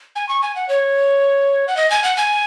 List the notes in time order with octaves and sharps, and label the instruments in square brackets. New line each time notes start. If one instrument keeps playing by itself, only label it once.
[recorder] G#5
C#6
G#5
F#5
C#5
F#5
D#5
G#5
F#5
G#5